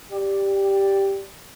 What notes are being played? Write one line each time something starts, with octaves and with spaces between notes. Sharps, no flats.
G4 D5